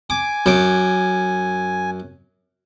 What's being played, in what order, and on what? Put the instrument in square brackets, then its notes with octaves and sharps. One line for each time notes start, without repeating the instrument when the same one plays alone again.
[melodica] G#5 [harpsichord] D6
[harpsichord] F#2 D6